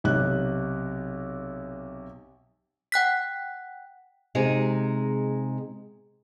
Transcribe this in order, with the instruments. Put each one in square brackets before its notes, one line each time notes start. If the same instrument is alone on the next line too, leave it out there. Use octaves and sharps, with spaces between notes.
[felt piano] B1 C3 F#6
[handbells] F#5 G5 F#6 B6
[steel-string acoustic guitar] C3 G#3 D#4 G#4